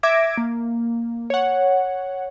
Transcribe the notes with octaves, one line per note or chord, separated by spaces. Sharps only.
E5 D6 G#6 A#6 D7
A#3
C#5 F#5